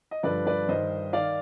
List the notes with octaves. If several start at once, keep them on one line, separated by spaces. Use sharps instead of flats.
D#5
G2 D3 F3 B4 D5
B4 D5
G2 D#3 C5 D#5
D#3 D5 F5